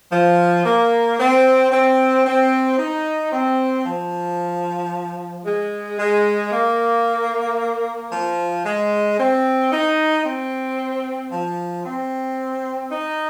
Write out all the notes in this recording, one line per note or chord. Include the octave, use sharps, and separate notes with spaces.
F3
A#3
C4
C4
C4
D#4
C4
F3
G#3
G#3
A#3
F3
G#3
C4
D#4
C4
F3
C4
D#4